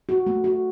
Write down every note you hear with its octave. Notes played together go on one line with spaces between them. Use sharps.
F#4
A3
F#4